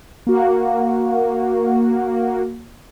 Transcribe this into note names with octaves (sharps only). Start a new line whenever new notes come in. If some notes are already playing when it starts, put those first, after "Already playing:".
A#3 F#4